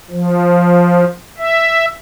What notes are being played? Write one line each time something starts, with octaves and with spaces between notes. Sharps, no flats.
F3
E5